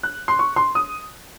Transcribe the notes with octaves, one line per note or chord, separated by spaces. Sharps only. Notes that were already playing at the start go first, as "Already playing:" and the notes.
F#6
C6
C#6
C6
D#6